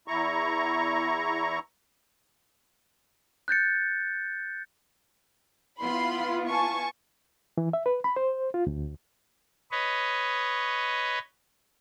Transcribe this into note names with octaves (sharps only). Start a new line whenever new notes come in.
E2 E4 A#5 C#6
F#6 G6 A6 C#7
B3 E4 F4 B5 C6
G#5 A5 C#6
E3
E5
B4
B5
C5
F4
D2
B4 C#5 D#5